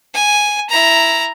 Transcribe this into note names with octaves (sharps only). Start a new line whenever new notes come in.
G#5
E4 A#5